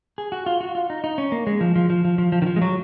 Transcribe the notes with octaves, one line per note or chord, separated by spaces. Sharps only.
G#4
F#4
F4
F#4
F4
D#4
D#4
C#4
A#3
G#3
F3
F3
F3
F3
F3
F3
D#3
F3
G#3
F#3